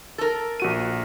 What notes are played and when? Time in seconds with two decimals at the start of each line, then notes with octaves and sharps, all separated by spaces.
0.18 A4 A#4
0.60 A#1 F#4 D#7